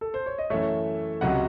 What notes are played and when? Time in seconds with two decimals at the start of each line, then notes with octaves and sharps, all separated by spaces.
0.01 A4
0.14 C5
0.26 C#5
0.38 D#5
0.50 F#2 E3 A3 C#5 E5
1.21 C#2 C3 F#3 C#4 D#5 F#5